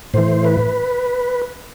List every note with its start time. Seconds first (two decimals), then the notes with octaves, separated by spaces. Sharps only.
0.14 A2 E3 C5
0.44 B4